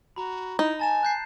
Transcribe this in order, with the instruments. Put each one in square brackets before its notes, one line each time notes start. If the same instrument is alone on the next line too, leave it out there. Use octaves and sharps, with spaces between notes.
[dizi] F#4 [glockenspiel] A#5 B5
[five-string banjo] D#4 [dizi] E4
[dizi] G#5 [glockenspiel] A5 A6 E7
[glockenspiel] F#6 G6 C7